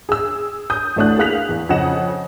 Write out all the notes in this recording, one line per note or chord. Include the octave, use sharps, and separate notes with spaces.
G#4 E6
D#6 G6
A1 D2 A3 D4 D#6 F#6
A#3 G#4 F5 F#6 B6 F7
E2
F2 C#3 D#5 F#5 E7